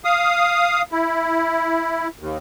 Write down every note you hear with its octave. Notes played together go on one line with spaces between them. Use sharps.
F5 D#6
E4
D#2